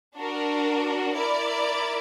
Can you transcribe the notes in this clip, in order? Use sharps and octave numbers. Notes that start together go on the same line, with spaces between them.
D4 F#4 A#4
E4 A#4 D5